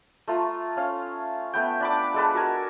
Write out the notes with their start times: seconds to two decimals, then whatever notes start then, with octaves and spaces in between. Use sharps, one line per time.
0.28 A3 F4 A#5
0.77 C#4 F5
1.53 A3 B3 G5
1.80 D4 B5 D6
2.14 G#3 A4 B4
2.34 F#4 A4 A#4 G#5